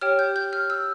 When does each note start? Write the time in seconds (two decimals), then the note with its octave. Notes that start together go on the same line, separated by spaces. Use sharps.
0.01 G4 C#5 G5 F6
0.19 G6
0.36 G6
0.53 F6
0.70 E6